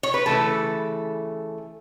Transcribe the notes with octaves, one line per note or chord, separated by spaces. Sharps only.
C#5
B4
C#3 E3 A3 A4